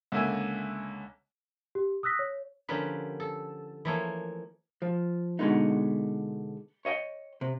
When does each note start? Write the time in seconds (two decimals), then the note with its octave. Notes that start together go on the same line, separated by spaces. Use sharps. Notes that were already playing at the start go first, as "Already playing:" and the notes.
0.12 C#2 D3 A#3 E5 G#5
1.75 G4
2.03 D#6 E6 F#6 A#6 B6
2.19 C#5
2.69 D3 F3 A#3 C#4 G4 B4
3.20 A4
3.85 E3 F3 A3 A#3 E4 C#5
4.82 F3
5.39 B2 D3 F3 G#3 B3 D#4
6.85 C#5 D#5 E5 G5
7.41 C3